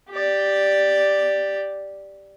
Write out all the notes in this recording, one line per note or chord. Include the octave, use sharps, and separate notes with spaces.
G4 D5